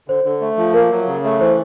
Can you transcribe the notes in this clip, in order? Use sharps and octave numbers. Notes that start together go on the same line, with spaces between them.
D3 C5
D3
A3
F3
A#3 A#4
F#3
C#3
A3
E3 C5